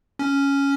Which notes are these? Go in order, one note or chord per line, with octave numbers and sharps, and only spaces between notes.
C#4